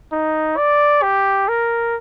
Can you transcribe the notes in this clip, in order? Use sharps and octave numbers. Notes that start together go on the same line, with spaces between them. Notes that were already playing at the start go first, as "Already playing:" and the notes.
D#4
D5
G4
A#4